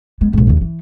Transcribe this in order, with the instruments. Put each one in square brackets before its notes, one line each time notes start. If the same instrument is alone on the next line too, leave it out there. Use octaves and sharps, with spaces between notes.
[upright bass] G#3 B3
A#1 G#2
D#2 C#3
E3